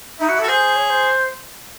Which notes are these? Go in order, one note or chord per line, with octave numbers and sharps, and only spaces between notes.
D#4 E4
F#4
E4
A4
F#4
G#4 C5
C#5
C5